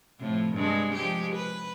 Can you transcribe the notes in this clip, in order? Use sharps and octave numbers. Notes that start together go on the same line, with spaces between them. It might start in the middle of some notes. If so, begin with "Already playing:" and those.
A2 C3 F3
G2 G#3
F3 G#3 G4
B4